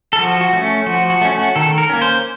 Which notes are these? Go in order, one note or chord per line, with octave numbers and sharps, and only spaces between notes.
A4
F3 F#4
F#4
A3 C#4
F3 F#4
F#4
A3 C#4
F#4
D#3 A4
A#4
A#3 C#4
C5